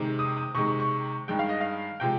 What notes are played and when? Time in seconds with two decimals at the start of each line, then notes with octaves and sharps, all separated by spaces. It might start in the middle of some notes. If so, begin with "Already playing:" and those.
Already playing: C3 D#3 G#3
0.19 D#6
0.37 D#6
0.55 C3 D#3 G#3 C#6
0.68 C#6
0.80 C#6
1.28 G2 D#3 G#3 G5
1.39 F5
1.49 D#5
1.61 F5
2.00 C3 F3 G#3 G5